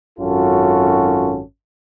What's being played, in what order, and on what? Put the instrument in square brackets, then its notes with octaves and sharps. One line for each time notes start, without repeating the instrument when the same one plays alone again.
[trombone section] G#1 F#2 C#4 F4 F#4 A4